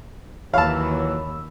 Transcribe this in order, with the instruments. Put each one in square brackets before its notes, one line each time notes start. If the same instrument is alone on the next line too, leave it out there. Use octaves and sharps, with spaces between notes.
[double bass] D#2 [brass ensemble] E3 F#3 [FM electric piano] C#5 B5 E6 [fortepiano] F5 A5